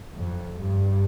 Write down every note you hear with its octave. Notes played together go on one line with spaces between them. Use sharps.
F2
G2